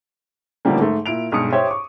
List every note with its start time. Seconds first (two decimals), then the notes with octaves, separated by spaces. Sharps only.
0.65 D#2 A2 D3 F3 G3 A#3
0.80 G#2 A3
1.06 A#2 E4 D7 F7
1.32 B1 G2 G#3 G#4 D#6 C#7
1.52 G4 C5 C#5 E5
1.67 C#6 D6